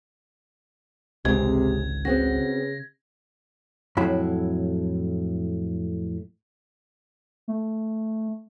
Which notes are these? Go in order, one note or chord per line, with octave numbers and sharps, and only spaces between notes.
G#1 C#2 C3 G#3 C4 D#4 G#6
C#3 B3 C4 F#4 A#6
F2 A2 F#3 E4 B5
A3